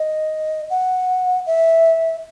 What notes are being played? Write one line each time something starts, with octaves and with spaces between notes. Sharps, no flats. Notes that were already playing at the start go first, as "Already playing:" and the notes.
Already playing: D#5
F#5
E5